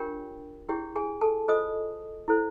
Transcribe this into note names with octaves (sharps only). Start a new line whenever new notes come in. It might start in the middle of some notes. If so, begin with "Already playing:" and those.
Already playing: D4 F4 G4 A#4 C#5 G5
E4 G4 G#4 C#5 G5
G#4 G#5
A4 A5
F4 A4 C5 D#5 D#6
E4 A4 C5